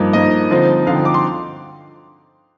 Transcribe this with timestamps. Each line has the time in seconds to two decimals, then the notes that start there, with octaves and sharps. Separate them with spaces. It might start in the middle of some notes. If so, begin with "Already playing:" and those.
Already playing: G2 F3 A#3 D#4
0.13 G2 F3 A#3 D#4 D#5
0.51 D3 F3 C4 D#4
0.87 D3 F3 C4 D#4 F5
0.95 G5
1.05 D6
1.14 C6